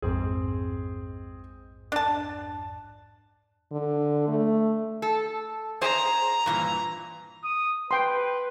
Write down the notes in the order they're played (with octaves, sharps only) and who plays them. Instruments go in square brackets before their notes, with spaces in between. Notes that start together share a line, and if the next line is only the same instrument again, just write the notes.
[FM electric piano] A#1 F2 G#2 [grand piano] C4 G#4
[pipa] D4 A5 [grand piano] F#6
[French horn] D3
A3
[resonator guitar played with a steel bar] A4
[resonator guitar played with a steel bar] G#4 C5 [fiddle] A#5
[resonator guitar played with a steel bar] G2 A#2 E3
[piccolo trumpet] D#6
[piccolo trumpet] B4 [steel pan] G5 C6